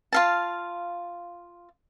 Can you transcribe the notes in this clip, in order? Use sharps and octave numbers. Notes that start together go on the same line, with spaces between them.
F4 F5 A5